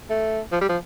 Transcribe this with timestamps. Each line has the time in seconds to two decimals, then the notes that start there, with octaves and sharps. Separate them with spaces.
0.10 A3
0.52 F3
0.61 G3
0.70 F3